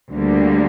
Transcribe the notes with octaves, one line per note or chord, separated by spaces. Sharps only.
D2 D3 G3 A#3